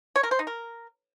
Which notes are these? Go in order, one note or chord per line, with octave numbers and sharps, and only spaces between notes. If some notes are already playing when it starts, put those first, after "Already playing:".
C#5
A#4
C5
D#4
A#4